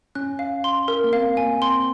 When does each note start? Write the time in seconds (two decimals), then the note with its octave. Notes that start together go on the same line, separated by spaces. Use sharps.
0.15 C#4 F#6
0.39 F5
0.64 C6
0.88 A#4
1.04 A#3
1.13 C4 F5
1.37 A#3 G#5
1.62 C4 C6